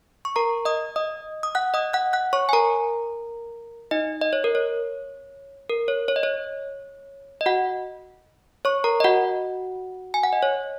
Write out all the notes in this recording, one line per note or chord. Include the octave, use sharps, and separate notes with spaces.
C#6
A#4 A#5
D#5 D#6
D#5 D#6
D#6
F#5 F#6
D#5 D#6
F#5 F#6
F#5 F#6
C#5 C#6
G#5
A#4 A#5
D#4 D#5
D#5
C#5
A#4
C#5
A#4
C#5
C#5
D#5
C#5
D#5
F#4 F#5
C#5 C#6
A#4 A#5
D#5
F#4 F#5
G#5
F#5
D#5
C#5